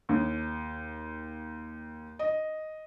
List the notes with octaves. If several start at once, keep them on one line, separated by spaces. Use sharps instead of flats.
D#2
D#5